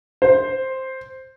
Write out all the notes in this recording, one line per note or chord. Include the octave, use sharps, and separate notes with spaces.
C5